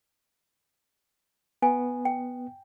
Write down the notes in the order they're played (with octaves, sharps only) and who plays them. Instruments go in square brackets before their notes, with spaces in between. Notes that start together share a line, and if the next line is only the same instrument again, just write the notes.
[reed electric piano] B3 [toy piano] G#5
[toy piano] G5